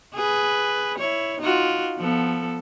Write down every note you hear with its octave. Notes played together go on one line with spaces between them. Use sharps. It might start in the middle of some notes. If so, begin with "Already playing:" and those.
G#4 B4
E4 C#5
D#4 F4 F#4
F3 B3 A4